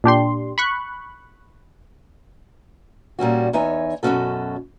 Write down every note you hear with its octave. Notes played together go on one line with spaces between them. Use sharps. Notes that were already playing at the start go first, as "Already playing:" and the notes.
A#2 D4 G4 C6
B5 C#6 F#6
A#2 G3 C#4 F#4
E2 D#4 C#5 E5 G#5
F#2 B2 A3 C#4 F#4 A4